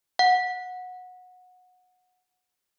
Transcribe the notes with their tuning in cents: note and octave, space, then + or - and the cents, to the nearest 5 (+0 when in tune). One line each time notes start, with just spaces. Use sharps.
F#5 -20